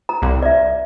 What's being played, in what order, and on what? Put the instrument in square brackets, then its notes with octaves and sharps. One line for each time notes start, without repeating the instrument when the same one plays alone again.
[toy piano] A#5
[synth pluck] C2
[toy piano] D5 E5